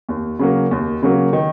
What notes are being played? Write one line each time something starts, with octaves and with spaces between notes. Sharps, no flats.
D#2
C#3 F#3 A#3
D#2
C#3 F#3 A#3
D#3